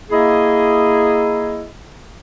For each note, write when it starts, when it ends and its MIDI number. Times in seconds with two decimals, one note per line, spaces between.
0.11 1.66 58
0.11 1.66 64
0.11 1.66 68
0.11 1.66 75